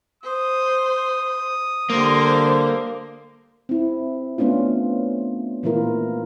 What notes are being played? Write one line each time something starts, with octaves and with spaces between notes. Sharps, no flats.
C5 D#6
D3 G3 A#3 C5
C4 E4
A3 B3 C#4 D4 F4
A#2 E3 A3 E4 F4 A#4